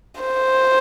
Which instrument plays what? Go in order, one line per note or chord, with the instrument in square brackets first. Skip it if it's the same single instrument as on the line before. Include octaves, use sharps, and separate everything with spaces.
[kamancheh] C5